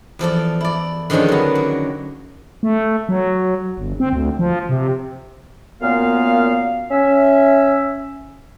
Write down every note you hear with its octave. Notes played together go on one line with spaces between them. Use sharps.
E2 F3 A4 D5
E4 D5
D3 D#3 F3 G#3 C#4 D4
F#3 B3
A#3
A3
F#3
G1
C4
D2
F3
C3
F#2 A#2 B3 F5
C#4 E5